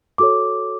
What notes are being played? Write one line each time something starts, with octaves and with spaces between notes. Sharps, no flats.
F#4 A4 C#5 D6